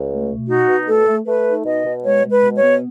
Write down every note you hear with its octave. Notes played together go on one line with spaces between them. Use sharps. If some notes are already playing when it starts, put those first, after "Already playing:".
Already playing: C#2
A3
B2
D#4 F#4
B2
A3 A4
A3
A3 B4
D#4
B2 D#5
B2
G#3 C#5
G#3
B4
B2
C#5
B3